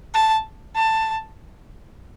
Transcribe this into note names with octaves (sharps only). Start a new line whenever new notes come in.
A5
A5